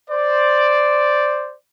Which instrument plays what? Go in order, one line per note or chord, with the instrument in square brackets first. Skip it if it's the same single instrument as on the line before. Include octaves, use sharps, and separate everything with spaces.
[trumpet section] C5 D5